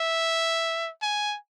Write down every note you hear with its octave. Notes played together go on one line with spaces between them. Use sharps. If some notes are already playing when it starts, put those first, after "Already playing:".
Already playing: E5
G#5